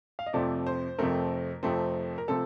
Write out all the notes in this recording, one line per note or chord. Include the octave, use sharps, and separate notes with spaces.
F5
D#5
F2 C3 F3 A3 C4 D5
C5
F2 C3 F3 A3 C4 A#4
F2 C3 F3 A3 C4
A#4
C3 F3 A3 C4 A4